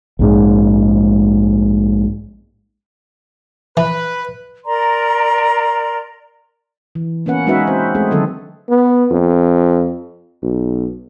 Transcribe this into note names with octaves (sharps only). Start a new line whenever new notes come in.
A#1 G#2 G#3
E3 B4
A#4 D5 A#5 C6
E3
A#3 B3 C#4 B4 F#5
G#3 C#4 D#4 F#4 B4 E5
C4 C5
G#3 A3 C4 G#4
D3 D#3 F#3 C4 A4
B3
F2
B1